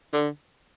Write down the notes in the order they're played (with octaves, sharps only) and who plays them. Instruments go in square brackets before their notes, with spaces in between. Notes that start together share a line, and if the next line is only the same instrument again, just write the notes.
[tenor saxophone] D3